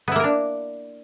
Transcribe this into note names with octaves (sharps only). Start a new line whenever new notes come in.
A#3 B3 D4 E4 A#4